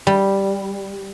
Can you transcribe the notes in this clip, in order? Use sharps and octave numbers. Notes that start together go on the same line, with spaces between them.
G3